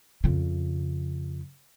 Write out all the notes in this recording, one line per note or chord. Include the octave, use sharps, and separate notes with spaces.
F2 C#3